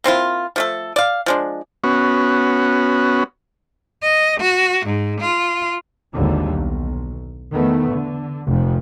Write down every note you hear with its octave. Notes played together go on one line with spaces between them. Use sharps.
A#3 C4 E4 F4
F3 A3 A4
D5 F5
F3 G#3 D4
B3 C#4 F#4
D#5
F#4
G#2
F4
G#1 D#2 D3 G3
B1
E2 D#3 A3 B3
D3
F1 F3